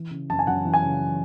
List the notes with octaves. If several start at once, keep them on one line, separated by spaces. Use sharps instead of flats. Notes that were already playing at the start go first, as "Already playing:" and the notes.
Already playing: E3
C#3
F#2 A5
G#5
F#2 F#5
E3
G#5
C#3